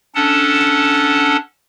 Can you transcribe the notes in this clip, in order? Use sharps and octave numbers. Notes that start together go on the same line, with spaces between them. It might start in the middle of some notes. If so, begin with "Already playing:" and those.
C#4 D4 A4 F#5 A5